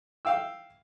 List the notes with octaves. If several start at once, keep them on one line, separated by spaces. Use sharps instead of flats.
F5 G5 E6